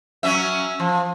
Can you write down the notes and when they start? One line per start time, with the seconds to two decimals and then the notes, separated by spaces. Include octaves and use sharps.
0.23 F#3 C#4 E5
0.80 F3